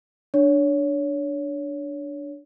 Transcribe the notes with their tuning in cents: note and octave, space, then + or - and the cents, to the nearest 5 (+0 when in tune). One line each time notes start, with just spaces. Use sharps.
D4 +0 C#5 +20